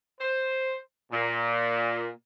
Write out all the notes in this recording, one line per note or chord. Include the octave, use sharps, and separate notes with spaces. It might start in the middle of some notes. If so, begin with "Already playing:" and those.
C5
A#2